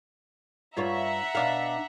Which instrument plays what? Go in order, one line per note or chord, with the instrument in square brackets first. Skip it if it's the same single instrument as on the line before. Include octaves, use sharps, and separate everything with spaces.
[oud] G2 F4 C#5 [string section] E5 F#5 A#5
[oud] B2 D4 F5